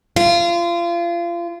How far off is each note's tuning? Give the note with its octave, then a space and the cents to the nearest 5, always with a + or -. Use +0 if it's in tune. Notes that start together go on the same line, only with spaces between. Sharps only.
F4 -30